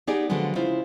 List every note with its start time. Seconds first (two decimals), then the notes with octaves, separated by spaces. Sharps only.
0.07 B3 D#4 G4 G#4 D5
0.30 D3 F3 F#3 G#3 B3
0.55 C#3 G#3 E4 F4 C5